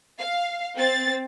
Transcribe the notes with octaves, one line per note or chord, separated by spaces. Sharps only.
F5
C4 A6